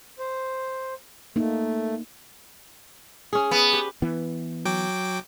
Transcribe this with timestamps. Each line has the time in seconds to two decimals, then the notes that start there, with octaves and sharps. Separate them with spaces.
0.19 C5
1.36 A3 A#3 D#4
3.33 C#4 G#4
3.51 B3
3.73 G4
4.02 E3 B3
4.65 F#3 G5 D6